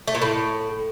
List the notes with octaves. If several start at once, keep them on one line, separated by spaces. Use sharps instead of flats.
A3
A#2
A2